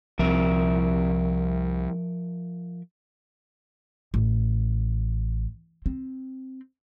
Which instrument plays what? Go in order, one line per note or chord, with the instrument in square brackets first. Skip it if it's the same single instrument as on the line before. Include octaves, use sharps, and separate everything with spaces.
[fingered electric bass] C2 C4 [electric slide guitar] F3 A#4 E5
[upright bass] A1
C4